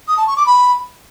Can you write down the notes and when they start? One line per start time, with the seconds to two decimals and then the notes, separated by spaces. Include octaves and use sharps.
0.08 D#6
0.18 A5
0.27 C#6
0.37 D6
0.46 B5